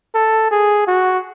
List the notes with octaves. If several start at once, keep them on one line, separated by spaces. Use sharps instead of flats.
A4
G#4
F#4